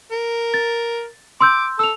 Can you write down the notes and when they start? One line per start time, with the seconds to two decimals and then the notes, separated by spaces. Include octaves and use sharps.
0.11 A#4
0.54 A6
1.41 C6 D6 E6 G6
1.79 A4 E6 F7